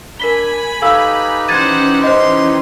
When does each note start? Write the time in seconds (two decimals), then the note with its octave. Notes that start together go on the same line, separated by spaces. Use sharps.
0.20 D4 A#4 G#5 B5 B6 G7
0.82 D#4 G4 A4 B4 F5 E6
1.48 E3 C#4 C5 F#5 G#6 A6 D#7
2.04 C5 D#5 C6